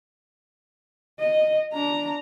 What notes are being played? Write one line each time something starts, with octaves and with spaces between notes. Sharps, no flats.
D#5
D4 A#5